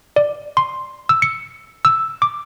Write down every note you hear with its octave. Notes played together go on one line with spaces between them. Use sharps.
D5
C6
E6
C#7
E6
D6